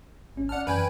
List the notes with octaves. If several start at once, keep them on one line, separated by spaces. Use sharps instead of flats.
G#1 C#4
D5 F#5 A5 F6
F#2 E3 C#4 B4 G5 G#5